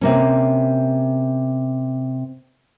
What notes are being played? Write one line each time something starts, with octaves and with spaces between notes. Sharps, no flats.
C3 A#3 C#4